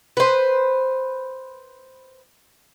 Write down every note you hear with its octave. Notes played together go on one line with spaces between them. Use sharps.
B4 C5